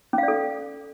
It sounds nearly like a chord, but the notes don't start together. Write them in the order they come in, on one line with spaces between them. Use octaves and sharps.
C#4 F5 D5 A4